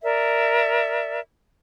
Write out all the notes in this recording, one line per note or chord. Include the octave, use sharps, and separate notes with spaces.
A#4 D5 E5